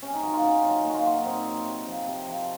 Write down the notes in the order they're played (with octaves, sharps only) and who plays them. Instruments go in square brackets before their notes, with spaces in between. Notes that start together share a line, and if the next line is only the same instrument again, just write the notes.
[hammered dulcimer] C3 C#4
D#4
D#3 F#3 F#4
F4
C3 C#4
D#3 F#3 C#4
A#2
F4 F#4
F#3 F4
D#4
A#2 C4
F#3
C3
F3
C3
F3